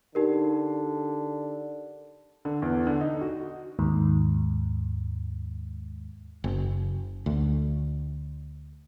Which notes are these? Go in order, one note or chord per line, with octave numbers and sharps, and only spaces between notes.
D3 D#4 G4 A#4
D3
E2
D3
D#4
F#4
D#2 G#2
F#1
D2